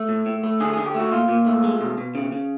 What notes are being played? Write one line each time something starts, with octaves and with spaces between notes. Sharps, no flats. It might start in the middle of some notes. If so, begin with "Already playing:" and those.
Already playing: A3
A2
A2
A3
D3 G#4
G#4
D3
G4
A3 F#4
A#2 F4
A#2
A3
G#3
B2
B2
C#3
C#3